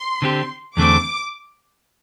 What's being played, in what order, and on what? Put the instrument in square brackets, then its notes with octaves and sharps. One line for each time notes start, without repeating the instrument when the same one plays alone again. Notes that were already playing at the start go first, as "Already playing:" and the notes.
Already playing: [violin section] C6
[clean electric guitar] D3 C4 G4
[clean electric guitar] E2 D3 A3 C4 [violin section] D6